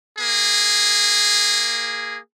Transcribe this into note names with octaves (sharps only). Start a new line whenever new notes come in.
A#3 G#4